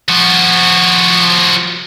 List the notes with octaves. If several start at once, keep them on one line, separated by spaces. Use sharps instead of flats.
F3 F#4